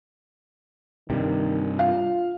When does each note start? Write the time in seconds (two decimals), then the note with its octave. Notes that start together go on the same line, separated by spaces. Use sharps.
1.10 G2 C3 D#3
1.79 F4 F5